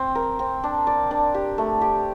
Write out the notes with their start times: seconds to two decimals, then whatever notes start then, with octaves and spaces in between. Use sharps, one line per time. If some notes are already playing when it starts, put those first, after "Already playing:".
Already playing: C4
0.15 A#4
0.39 C4
0.63 D4
0.87 D5
1.11 D4
1.34 G4
1.58 A3
1.81 G4